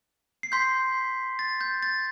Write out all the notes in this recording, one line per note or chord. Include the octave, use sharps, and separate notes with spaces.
C7
C6 G6 B6
A6
G6
A6